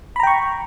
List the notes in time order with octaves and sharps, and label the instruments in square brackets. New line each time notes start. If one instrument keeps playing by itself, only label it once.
[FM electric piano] B5
A#5
G5
C#6